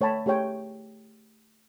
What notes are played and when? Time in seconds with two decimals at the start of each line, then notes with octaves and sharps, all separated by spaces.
0.01 A3 C#5 G5 A5 B5
0.26 A3 G4 G#4 C#5 G5